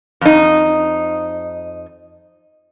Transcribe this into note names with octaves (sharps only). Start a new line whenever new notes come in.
F2 D#4